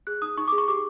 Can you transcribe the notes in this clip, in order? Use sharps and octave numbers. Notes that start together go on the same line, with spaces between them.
G#4 F#6
D#4 D#6
D#4 C#6
D6
G#4
C#6
G4 D6